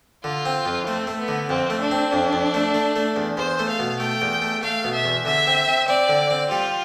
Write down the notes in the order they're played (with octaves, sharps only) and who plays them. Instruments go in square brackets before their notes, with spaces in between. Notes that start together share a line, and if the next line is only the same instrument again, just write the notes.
[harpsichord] D3 [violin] F4
[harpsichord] C4
F2
[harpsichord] A3 [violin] C4
[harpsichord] A3
[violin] B3
[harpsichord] D3
[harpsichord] F2 [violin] C4
[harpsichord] A3
[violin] D4
[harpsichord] C4
F2
F2
A3
A3
A3
E2
[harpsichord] E2 [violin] C5
[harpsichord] A3
[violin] F5
[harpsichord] B2
[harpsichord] A3 [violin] G5
[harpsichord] E2
A3
[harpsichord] A3 [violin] F5
[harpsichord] B2
[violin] E5
[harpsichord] E2
[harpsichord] D3 [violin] E5
[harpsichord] C4
C4
[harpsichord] C4 [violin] D5
[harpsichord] D3
C4
[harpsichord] G3 [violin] F4